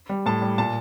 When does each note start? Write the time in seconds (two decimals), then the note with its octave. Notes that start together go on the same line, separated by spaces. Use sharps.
0.09 G3
0.26 A2 A5
0.42 G3
0.58 A#2 A5